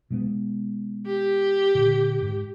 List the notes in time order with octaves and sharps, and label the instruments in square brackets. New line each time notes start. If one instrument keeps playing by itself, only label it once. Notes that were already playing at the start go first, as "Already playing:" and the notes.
[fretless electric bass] B2 G#3 B3
[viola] G4
[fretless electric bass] A#2 D3
G#2